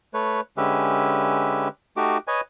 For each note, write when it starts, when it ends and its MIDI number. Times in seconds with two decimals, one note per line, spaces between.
0.14 0.41 57
0.14 0.41 71
0.14 0.41 73
0.57 1.68 50
0.57 1.68 56
0.57 1.68 61
0.57 1.68 67
0.57 1.68 71
0.57 1.68 76
1.97 2.18 57
1.97 2.18 63
1.97 2.18 66
1.97 2.18 67
1.97 2.18 86
2.28 2.41 71
2.28 2.41 73
2.28 2.41 75
2.28 2.41 80